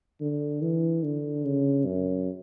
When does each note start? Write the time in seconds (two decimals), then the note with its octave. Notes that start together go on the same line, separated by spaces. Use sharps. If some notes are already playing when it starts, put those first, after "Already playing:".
0.21 D3
0.62 E3
1.03 D3
1.45 C#3
1.86 F#2